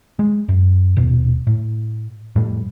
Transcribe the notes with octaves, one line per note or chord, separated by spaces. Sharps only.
G#3
F#2
D#1 B2
A2
F2 A2 G3 A3